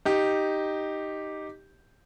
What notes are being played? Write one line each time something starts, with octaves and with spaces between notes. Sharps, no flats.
D#4 G4